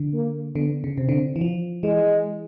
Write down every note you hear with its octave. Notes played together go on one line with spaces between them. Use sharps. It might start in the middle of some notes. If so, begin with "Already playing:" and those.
Already playing: D3
A#3
D3 B3
C#3
C3 C4
D3
E3
F3
E3 G#3